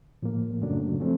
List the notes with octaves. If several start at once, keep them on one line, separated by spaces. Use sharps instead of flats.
A2 F3 A#3
F#2 C#3 F#3 A3 D4
F3 A3 C4